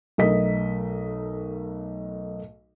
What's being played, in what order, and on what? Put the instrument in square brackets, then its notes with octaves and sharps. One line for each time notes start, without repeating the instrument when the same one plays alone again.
[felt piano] B1 A3 A#4 D#5 B6